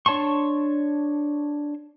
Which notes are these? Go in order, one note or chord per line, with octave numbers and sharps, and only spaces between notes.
D4 C#5 A5 C6 C#6